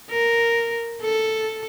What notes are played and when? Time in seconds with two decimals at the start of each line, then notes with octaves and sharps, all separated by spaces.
0.10 A#4
1.02 A4